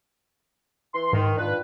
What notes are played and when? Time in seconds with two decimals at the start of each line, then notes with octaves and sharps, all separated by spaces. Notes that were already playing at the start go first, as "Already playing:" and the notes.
0.94 E3 C6
1.13 G#2 D#3
1.38 D4 F4 B4